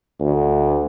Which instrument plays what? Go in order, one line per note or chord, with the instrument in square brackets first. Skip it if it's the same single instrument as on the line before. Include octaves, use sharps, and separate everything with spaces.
[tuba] D2